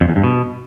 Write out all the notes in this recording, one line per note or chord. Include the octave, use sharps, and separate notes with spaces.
F2
E2
G2
B2